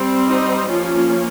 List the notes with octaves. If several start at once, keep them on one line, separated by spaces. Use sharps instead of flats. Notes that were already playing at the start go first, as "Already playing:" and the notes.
Already playing: G3 C4
D#4
F3 A#3 C#4 F4